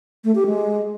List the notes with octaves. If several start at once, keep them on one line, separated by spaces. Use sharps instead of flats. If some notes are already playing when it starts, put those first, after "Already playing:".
A3
G4
G#3